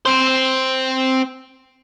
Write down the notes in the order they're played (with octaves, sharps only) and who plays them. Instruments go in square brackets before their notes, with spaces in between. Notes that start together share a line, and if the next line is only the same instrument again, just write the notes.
[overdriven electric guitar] C4 C5